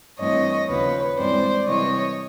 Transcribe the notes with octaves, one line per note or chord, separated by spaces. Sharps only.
G2 E3 A3 C4 C#5 D#5
D#2 C#3 F3 B4 C#5
G2 E3 G#3 C4 C5 D5
C3 E3 G3 C4 C#5 D#5